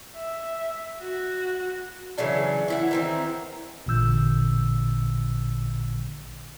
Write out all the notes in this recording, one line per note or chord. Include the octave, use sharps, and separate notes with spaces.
E5
F#4
C#3 E3 F#3 D4
E3 E4 F#5
D#3 E3 C4
A1 A#2 D3 E6 G6